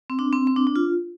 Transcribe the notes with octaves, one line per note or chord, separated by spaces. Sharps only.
C4
D4
C4
C4
D4
D4
F4